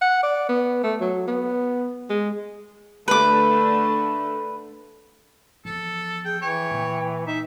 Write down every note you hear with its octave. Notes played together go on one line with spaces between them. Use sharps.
F#5
D5
B3
A3
F#3
B3
G#3
D3 A3 D4 B4 D6
E2 F3 A4
G#4 G5
E3 C#5 G5
A#2
D#4 E5